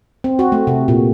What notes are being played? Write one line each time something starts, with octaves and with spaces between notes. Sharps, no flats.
C4
F#4
A3
C3
A#2